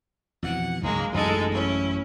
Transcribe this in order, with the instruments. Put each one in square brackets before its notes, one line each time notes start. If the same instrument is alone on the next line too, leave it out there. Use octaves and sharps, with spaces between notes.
[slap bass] F2 B2 E3 [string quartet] F#5
[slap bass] C#2 G#2 [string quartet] F#3 G#3 A#3
[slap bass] A1 F#2 F#3 [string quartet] G#3 D#4 A4
[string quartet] C#4 E4